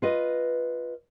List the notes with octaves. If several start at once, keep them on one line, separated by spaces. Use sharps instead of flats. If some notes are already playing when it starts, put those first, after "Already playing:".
F4 B4 D#5